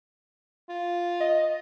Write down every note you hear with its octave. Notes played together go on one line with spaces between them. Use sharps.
F4
D#5